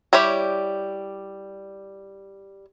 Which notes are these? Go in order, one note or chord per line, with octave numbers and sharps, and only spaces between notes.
G3 E4 G4 C#5